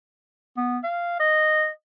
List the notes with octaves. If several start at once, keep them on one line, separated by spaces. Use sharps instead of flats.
B3
F5
D#5